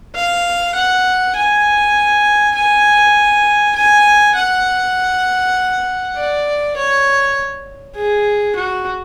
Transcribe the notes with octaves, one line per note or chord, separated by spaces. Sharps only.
F5
F#5
G#5
G#5
G#5
F#5
D5
C#5
G#4
F#4